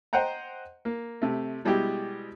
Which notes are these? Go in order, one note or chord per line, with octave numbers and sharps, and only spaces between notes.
C5 D#5 F#5 G5 A#5
A#3
C3 A3
B2 G3 G#3 E4 G4